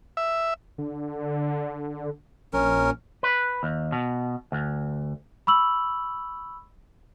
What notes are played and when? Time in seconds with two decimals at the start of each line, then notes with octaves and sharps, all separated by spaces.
0.17 E5
0.78 D3
2.53 A#1 C#4 A#4
3.23 B4
3.63 D#2
3.92 B2
4.52 D2
5.47 B5 C#6 E6 F#7